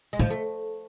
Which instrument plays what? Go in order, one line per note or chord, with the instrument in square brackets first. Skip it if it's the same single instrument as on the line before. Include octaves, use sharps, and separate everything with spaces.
[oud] G#3
[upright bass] A2 [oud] F3
[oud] A3